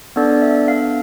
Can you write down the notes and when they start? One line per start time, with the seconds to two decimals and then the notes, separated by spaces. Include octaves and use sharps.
0.16 B3 D4 A4 D5
0.33 D5
0.42 E5
0.68 F5